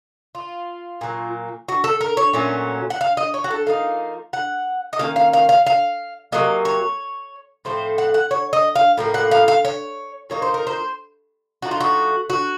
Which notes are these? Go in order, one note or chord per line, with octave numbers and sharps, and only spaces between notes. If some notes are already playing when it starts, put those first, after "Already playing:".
F4
A#2 F#3 A#3
F#4
A4
A#4
C#5
A#2 F#3 A3 C#4
F#5
F5
D#5
C#5
F#4
A4
F3 A#3 D#4 F5
F#5
D#5
D#3 A#3 C#4 F5
F5
F5
F5
F5
C3 F#3 A#3 D#5
C#5
A2 F3 A3 C4 C5
F#5
F#5
C#5
D#5
F5
A2 F3 A#3
F#5
F5
F5
C#5
F3 A#3 D#4 C#5
C5
A#4
C5
F3 A3 D#4 F#4
F4
F#4
F#4